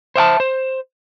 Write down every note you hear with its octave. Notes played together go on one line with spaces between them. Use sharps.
C5 E5 G5 A5
C5